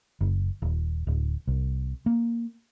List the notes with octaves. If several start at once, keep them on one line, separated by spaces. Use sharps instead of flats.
F#1
D#1
D1
C2
A#3